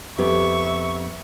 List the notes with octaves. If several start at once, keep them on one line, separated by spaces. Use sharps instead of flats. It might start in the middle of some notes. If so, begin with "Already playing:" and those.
F2 B3 G4 E5 C#6